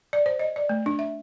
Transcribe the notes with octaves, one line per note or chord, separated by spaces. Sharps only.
D5
C5
D#5
D5
A3
D4
E5